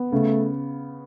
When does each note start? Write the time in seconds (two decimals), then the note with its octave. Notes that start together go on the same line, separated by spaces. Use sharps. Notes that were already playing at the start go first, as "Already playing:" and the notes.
Already playing: B3
0.12 C#3 A3